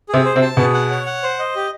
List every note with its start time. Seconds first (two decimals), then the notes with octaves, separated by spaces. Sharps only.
0.09 C3 C4 G#4
0.25 C5
0.36 C3 C4
0.42 A5
0.57 B2 B3 G#4
0.74 F#5
0.90 C#5
1.06 F#5
1.23 C5
1.39 D#5
1.56 G4